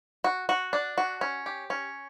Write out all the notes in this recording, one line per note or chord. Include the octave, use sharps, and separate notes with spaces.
F#4
F#4
D4
F#4
C#4
G4
C#4